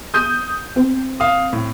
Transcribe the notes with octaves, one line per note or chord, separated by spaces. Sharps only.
D#6 G6 D#7
C4
F5 D#6
A2